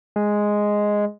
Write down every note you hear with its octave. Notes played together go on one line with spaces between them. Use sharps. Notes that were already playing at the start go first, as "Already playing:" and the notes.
G#3